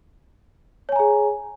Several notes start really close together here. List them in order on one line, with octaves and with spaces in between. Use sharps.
C#5 G#5 A#5 G#4